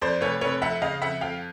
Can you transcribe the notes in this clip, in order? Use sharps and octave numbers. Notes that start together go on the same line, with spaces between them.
F2 C5 D5
F1 B4 C#5
F1 B4 C#5
F2 E5 F#5
C#3 D#5 F5
F2 E5 F#5
F2 F5 G5